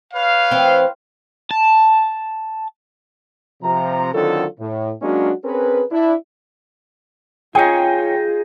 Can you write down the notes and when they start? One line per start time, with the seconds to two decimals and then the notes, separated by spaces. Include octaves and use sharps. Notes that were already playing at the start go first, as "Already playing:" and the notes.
0.14 B4 C#5 F5
0.51 E3 C4
1.51 A5
3.63 C3 F3 A#5
4.14 D3 D#3 F#3 C4 F4 A4
4.60 A2
5.02 F#3 G#3 A#3 C#4 D4 F#4
5.45 C4 C#4 G#4 A#4 B4
5.92 D4 E4
7.55 D#4 F4 G#4 C#5 G5 G#5